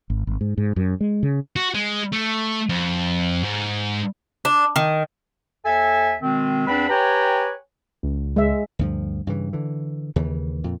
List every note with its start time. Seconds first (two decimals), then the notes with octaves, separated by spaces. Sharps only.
0.10 G#1
0.27 G#1
0.41 G#2
0.58 G#2
0.76 F#2
1.01 G#3
1.23 C#3
1.56 F#4
1.75 G#3
2.13 A3
2.69 F2
3.44 G#2
4.45 D4
4.76 D#3
5.65 D#2 A4 E5 G#5
6.23 B2 D#3 G#3 C4
6.67 E2 C4 D4 B4 B5
6.89 G4 B4 C#5 G5 G#5 A#5
8.03 C#2
8.36 G#3 E5
8.79 D2 G2 F3
9.27 G2 C#3 E3
9.53 D3 E3
10.16 D#2 C#3 E3
10.64 F2 A#2